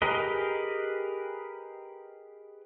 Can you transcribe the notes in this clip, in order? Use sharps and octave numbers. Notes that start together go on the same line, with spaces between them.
G4 G#4 A#4 B4 D#5